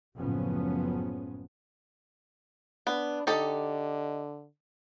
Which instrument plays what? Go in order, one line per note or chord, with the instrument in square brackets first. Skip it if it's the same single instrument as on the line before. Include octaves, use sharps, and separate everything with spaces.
[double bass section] F#1 A2 C#3 F3 B3 C#4
[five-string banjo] B3 [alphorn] D4
[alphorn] D3 [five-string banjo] D#4 G4 A4